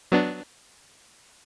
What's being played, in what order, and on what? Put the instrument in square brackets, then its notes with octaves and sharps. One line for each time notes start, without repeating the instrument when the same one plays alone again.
[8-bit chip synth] F#3 B3 D4